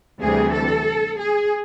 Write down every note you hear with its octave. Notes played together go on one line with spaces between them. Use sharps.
D2 C3 E3 G3 G#4
A4
G#4